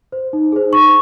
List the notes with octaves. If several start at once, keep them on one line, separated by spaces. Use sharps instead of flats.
C5
D#4
G#4 C5
D#4 C#6